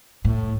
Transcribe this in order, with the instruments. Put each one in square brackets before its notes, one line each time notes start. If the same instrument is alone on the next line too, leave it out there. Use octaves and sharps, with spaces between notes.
[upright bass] A2